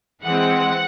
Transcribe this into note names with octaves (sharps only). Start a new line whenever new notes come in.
E3 G#3 C4 F#5